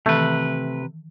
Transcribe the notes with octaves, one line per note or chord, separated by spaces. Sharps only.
C3 D#3 E3 A3 B4